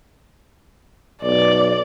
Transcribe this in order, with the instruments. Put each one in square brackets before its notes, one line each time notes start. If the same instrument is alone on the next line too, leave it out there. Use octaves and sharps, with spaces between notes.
[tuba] B1 [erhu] D5